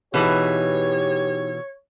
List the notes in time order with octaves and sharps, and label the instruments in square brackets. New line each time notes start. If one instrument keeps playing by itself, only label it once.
[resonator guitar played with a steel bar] B2 E3 [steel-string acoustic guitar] D#4 G#4 B4 [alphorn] G4 [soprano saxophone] C#5